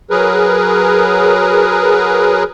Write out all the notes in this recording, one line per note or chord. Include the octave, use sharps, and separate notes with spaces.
F#3 G#4 A#4 B4